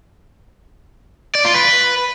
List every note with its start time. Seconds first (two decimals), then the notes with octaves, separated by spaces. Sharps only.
1.35 D5
1.45 F4
1.54 B4